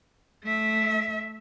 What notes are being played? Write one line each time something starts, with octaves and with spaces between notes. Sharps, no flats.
A3 E5